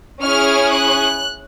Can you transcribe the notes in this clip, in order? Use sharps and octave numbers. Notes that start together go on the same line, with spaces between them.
C#4 E4 G#4 F6
F#6